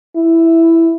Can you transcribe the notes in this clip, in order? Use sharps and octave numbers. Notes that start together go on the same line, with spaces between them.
E4